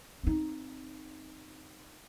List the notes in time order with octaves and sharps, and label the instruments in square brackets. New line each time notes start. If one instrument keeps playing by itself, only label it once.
[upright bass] C4 D#4